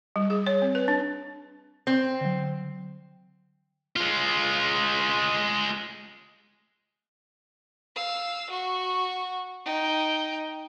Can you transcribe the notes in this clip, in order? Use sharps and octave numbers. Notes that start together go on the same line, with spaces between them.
G3
G#4
C#5
C4
B4
D4
C4
D3 F#3
G#3 F4
F5 E6
F#4 C#6
D#4 G5